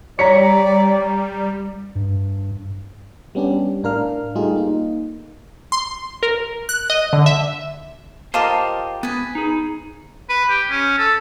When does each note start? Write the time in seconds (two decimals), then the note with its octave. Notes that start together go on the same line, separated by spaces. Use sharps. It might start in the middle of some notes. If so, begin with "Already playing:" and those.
0.19 G3 C#5 D5 A#5 B6 C#7
1.95 G2
3.35 G3 B3 C#4 D4 G4
3.83 A2 D4 A#4 F5 F6
4.35 G3 A3 D#4 F4 G4 G#4
4.56 A#3 D#4
5.72 C6
6.23 A#4
6.69 F#6
6.90 D#5
7.13 D3
7.26 E5
8.34 F4 G4 A#4 C5 D#5 A5
9.03 B3 B4 G#5
9.35 D#4 G#4
10.29 B4
10.49 G4
10.70 C#4
10.98 A4